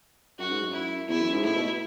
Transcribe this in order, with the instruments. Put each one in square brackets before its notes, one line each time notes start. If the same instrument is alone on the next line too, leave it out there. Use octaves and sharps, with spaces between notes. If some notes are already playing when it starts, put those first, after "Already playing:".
[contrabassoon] F#2 [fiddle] F#4
[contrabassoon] G#2
F#2
[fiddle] E4
[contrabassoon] E2 [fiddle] E4
[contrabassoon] F#2
G#2
[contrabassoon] A2 [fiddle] E4
[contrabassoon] B2